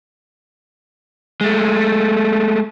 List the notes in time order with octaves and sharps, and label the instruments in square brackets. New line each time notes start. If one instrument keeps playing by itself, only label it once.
[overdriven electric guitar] G#3 A3